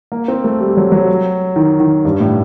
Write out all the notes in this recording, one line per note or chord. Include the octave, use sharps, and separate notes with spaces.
A#3
C4
A3
G3
F#3
F#3
D#3
D#3
G2
A2